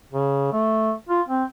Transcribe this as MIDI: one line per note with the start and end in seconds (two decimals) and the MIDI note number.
0.12 0.48 49
0.53 0.93 57
1.09 1.21 65
1.29 1.44 60